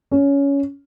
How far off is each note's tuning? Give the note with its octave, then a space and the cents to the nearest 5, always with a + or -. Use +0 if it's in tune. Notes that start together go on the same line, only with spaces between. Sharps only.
C#4 +15